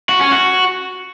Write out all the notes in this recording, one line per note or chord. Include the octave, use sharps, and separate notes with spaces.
F#4
C#4
F#4